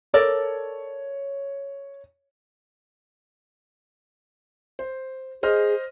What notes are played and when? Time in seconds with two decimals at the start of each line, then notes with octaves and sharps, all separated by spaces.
0.14 A4 A#4 C#5 D5
4.79 C5
5.43 G#4 C5 D#5 F6